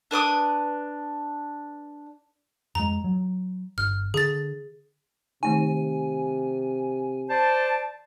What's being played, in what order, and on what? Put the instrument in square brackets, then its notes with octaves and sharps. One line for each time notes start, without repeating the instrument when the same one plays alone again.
[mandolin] D4 B4 D6 D#6
[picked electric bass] F2 G#3 [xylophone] A#5
[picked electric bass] F#3
[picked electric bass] G1 [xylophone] F6
[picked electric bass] D3 [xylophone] G#4 A6
[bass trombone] C3 [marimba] D#3 A3 D#4 [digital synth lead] G#5
[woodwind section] C5 D5 A5